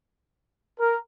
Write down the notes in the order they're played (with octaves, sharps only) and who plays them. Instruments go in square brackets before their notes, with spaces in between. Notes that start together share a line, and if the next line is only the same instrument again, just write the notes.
[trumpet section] A#4